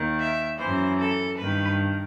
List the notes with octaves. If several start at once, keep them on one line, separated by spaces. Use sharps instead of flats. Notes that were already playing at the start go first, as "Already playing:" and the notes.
Already playing: D#2 D#3
E5
F#2 E3 C5
A4
G2 D#3 B4